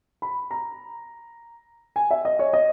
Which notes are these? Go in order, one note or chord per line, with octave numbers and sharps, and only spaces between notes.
B5
A#5
G#5
E5
D#5
C#5
D#5